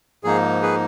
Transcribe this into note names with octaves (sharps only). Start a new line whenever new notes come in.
G#2 F3 A#3 D#4 G#4
G#4 B4